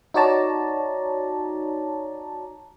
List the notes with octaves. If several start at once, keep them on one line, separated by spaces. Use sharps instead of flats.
D#4 F#4 C#5 D5 A5 A#5